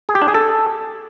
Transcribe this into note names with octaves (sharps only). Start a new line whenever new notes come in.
G#4
G4
D4
G#4
A4